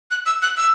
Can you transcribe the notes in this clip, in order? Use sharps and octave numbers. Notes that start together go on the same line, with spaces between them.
F#6
E6
F#6
E6